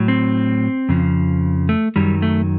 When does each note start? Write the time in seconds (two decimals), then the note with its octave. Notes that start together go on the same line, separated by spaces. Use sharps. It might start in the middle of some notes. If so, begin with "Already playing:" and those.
Already playing: A2 F#3
0.08 C4
0.89 F2 C#3 F3
1.69 A3
1.96 F#2 D#3 F#3 G3
2.22 A3